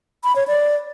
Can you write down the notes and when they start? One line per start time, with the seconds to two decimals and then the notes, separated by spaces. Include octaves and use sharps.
0.24 B5
0.36 C#5
0.48 D5